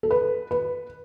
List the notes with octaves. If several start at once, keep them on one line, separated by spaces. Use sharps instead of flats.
A4
B4
B4